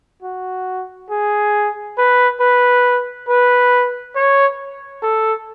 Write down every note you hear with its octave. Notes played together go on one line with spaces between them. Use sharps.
F#4
G#4
B4
B4
B4
C#5
A4